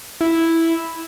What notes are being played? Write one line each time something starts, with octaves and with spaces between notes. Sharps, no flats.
E4